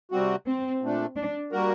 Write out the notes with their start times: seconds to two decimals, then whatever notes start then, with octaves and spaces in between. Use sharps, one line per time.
0.11 C3 G3 C4 F#4
0.47 C4
0.81 A#2 A3 D4
1.16 D4
1.52 G3 A#3 F#4 A#4